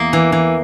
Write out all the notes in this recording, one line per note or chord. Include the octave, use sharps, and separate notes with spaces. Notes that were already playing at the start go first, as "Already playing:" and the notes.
Already playing: E2 A#3
E3
E3